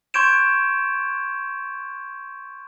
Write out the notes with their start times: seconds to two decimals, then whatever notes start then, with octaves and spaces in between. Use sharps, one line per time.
0.14 C6 C#6 G6 G#6 D7 E7